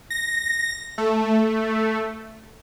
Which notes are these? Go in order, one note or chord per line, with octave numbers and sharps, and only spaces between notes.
A#6
A3